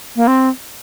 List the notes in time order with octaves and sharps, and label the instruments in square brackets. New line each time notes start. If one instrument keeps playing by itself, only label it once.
[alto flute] A#3
C4